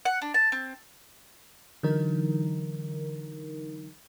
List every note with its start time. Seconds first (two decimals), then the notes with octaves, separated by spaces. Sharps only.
0.05 F#5
0.22 D4
0.34 A5
0.52 C4
1.83 D3 E3 F#3 D#4 A#4